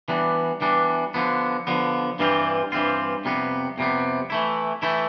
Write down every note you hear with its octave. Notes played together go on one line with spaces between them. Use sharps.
E3 G3 B3 D4
E3 G3 B3 D4
D3 F3 B3
D3 F3 B3
G2 E3 G3 C4 F4
G2 E3 G3 C4 F4
F2 C3 G3 B3
F2 C3 G3 B3
E3 A3 E4
E3 A3 E4